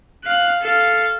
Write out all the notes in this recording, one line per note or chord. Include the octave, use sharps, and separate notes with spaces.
F5 F#6
A4 F5